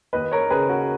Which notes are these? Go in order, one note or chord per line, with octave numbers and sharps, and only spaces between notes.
D#2 B4 D#5
A#4 C#5
C#3 G#4 B4
F#4 A#4